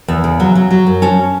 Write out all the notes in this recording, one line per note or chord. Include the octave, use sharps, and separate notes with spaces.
E2 E5
C#3
F#3
F#3
F#3
F#2
C#4 A5